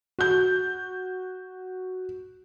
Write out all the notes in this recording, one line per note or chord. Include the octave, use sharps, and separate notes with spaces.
F#4 G6